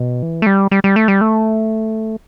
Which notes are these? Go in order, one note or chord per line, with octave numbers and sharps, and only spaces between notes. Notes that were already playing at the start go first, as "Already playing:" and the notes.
Already playing: B2
E3
A3
G3
G3
G3
A3
G3
A3